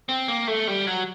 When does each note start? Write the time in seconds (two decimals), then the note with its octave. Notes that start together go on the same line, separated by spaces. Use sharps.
0.09 C4
0.28 A#3
0.47 A3
0.67 G3
0.87 F#3